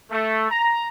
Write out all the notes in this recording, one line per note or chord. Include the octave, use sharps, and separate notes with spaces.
A3
A#5